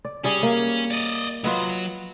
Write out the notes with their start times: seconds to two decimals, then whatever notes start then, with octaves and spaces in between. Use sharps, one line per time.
0.05 D5
0.24 G3 C#4 G#4 D5
0.43 A#3
0.91 D5 D#5
1.44 F#3 F4 B4 D#5